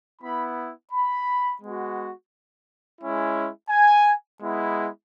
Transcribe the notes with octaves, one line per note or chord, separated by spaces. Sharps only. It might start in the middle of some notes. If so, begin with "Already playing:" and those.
B3 E4 B5
B5
G#3 B3 F#4
G#3 C#4 E4
G#5
G#3 B3 E4